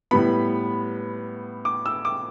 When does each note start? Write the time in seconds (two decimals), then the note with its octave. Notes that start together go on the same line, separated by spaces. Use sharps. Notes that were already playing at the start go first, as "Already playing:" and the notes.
0.11 A2 G3 B3 B5
1.65 D6
1.86 E6
2.05 D6